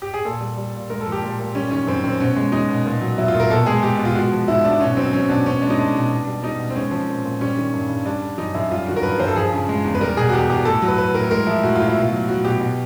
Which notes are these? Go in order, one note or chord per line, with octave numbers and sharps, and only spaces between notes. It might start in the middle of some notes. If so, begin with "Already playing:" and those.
G4
G#4
A#2 A4
G3
G3
A#2
G#3 A#4
A4
F3
G4
A#2
A#2
G3 C#4
D#3 C#4
F#2 C4
F#2 C4
B2 C#4
G#3
G#3 D#4
B2
A#2
F#3
F#3 E4
F4
A#2
A#4
B2 A4
G#3 G#4
G#3 G4
B2
F4
G#3 F#4
F3
G#2 E4
G#2 D4
B2 C#4
F#3 C4
F#3 C#4
B2 D4
B2 C#4
G#3 D4
D#4
G#3 D4
B2
B2
G3
G3 D#4
B2
C4
G#3 C#4
F3 C4
A#2
A#2
G3 C#4
D#3
G2
G2
G3 D4
D3
F#2 D#4
F#2 E4
G3 F4
D#3 F#4
A#4
G2 B4
G2 C5
A4
F3 G#4
C#3
G#3
E2
B4
G3 A#4
B2 G#4
F#4
E2 G4
E2 G4
A2 A4
F#3
B4
F#3 B4
A2 A#4
G#3 A#4
F3 E4
A2 F#4
A2 F4
E4
B2 F4
F#3
F#3 F#4
B2 G4
B2